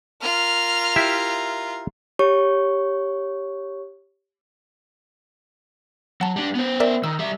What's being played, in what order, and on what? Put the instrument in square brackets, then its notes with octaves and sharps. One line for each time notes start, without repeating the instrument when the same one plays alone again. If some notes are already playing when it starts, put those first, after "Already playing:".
[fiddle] F4 [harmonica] A#4 [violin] F6
[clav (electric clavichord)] E4 G4 E5
[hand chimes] G4 C#5 C#6
[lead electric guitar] F#3 [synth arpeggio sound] F#5 A5
[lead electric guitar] G3 D4
B3 C5
[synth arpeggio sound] A#4 D5 E5
[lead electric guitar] D#3 [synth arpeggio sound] E6
[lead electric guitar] G3 E5